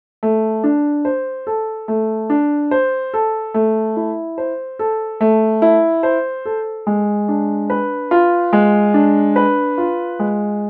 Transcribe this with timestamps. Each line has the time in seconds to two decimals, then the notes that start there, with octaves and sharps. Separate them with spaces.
0.23 A3
0.64 D4
1.05 C5
1.47 A4
1.88 A3
2.30 D4
2.71 C5
3.14 A4
3.54 A3
3.97 E4
4.38 C5
4.79 A4
5.21 A3
5.62 E4
6.03 C5
6.45 A4
6.87 G#3
7.28 D4
7.70 B4
8.11 F4
8.53 G#3
8.94 D4
9.36 B4
9.78 F4
10.20 G#3